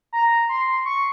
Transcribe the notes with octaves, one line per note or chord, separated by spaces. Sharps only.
A#5
C6
C#6